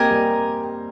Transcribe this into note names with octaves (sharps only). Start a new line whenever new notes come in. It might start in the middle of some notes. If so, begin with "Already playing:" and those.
Already playing: A#3 C4 G4 A#4 D#5 G#5
G3